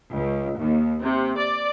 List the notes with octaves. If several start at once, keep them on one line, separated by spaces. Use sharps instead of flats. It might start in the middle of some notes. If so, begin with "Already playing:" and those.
C#2
D#2
C3
D5